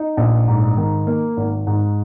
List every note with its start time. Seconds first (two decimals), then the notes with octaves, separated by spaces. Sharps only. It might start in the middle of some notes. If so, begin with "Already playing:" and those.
Already playing: D#4
0.17 A#1
0.48 G#2
0.77 D#3
1.07 A#3
1.37 G#1
1.67 G#2